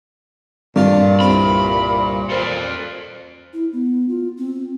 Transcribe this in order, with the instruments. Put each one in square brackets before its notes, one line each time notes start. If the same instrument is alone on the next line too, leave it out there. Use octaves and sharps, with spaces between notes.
[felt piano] G2 [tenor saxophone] A#2 [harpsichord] D4 F4
[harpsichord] C2 C4 [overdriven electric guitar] B5
[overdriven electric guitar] A4 C5
[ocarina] E4
B3
F4
C4